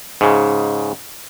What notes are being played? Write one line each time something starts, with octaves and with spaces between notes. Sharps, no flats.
G#2 C#3